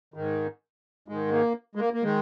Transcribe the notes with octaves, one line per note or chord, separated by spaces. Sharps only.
G#2 D#3
G#2 D#3 G#3
A#3
G#3
A#3
A#3
D#3 G#3